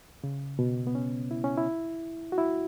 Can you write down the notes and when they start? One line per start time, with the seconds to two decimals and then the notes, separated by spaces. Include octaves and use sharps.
0.24 C#3
0.59 B2
0.87 B3
0.95 C#4
1.31 E4
1.44 C#4
1.58 E4
2.32 F#4
2.38 E4